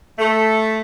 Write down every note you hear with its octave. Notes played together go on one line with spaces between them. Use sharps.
A3